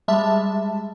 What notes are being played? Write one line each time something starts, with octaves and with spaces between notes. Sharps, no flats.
G3 G#3 E5 A5